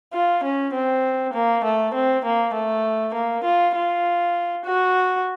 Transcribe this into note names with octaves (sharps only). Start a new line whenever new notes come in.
F4
C#4
C4
A#3
A3
C4
A#3
A3
A#3
F4
F4
F#4